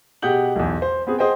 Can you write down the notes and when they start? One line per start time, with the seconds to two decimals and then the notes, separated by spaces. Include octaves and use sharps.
0.22 B2 G4 G#4 F#5 G6 F#7
0.56 B1 E2
0.82 C5
1.07 B3 C4 G#4
1.19 G#4 C5 D#5 F#5 G5